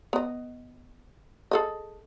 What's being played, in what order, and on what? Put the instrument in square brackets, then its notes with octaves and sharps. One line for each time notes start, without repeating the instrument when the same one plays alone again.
[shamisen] B3 D#5
G#4 A4 D#5